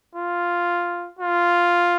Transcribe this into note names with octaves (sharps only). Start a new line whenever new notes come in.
F4
F4